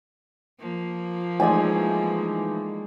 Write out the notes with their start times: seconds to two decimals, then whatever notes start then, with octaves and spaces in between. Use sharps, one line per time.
0.60 F3 A#3
1.40 E3 G#3 A3 D#4 D5 G#5